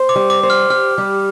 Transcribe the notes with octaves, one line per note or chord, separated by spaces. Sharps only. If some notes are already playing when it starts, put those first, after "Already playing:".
Already playing: C5
D6
G3
D6
C5
F6
G4 F6
G3